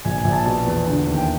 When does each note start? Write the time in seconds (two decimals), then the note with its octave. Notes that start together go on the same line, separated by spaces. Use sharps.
0.05 A#1 G#5
0.18 G#5
0.24 A#1
0.32 A5
0.46 B2 A5
0.66 E2
0.87 D3
1.07 D#2
1.17 G5